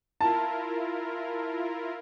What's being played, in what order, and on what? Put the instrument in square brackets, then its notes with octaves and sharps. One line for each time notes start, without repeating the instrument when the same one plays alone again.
[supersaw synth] E4 F4 A#4 [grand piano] A5